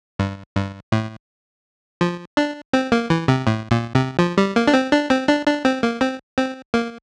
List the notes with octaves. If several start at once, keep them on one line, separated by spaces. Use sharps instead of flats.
G2
G2
A2
F3
D4
C4
A#3
E3
C3
A2
A#2
C3
F3
G3
A#3
D4
C4
D4
C4
D4
D4
C4
A#3
C4
C4
A#3